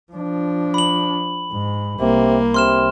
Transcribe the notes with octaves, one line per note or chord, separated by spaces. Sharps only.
F3 D4
B5 F#7
G#2
C2 C3 A#3
C3 C6 F6 E7